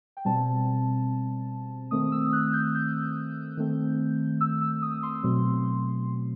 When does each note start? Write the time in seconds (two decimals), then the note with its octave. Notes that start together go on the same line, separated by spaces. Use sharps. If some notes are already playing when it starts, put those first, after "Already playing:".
0.17 G5
0.25 B2 G3 C4 A5
1.91 D#3 A3 C4 D#6
2.12 E6
2.33 F#6
2.53 G6
2.75 G6
3.57 D#3 A3 C4
4.41 E6
4.61 E6
4.82 D#6
5.03 C6
5.23 B2 F#3 A3 C4